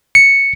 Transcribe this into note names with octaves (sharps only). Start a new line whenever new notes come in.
C#7